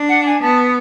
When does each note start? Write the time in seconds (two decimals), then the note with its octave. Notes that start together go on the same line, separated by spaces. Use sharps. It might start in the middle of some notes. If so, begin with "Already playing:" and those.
Already playing: D4
0.08 F#5
0.25 G#5
0.42 B3 A5